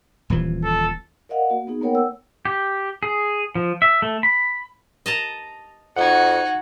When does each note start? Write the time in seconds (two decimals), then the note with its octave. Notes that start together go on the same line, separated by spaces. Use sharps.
0.30 D#1 E3 F3
0.64 A4
1.29 A#4 D5 D#5 F5 F#5
1.50 A#3 F#4
1.67 B3 D#4 G#4
1.81 A#3 B3 A#4 C#5 F#5 G5
1.95 E6
2.45 G4
3.03 G#4
3.55 F3
3.82 E5
4.02 A3
4.23 B5
5.06 D#5 A5 A#5
5.96 F2 D#4 F#4 F#5 G#6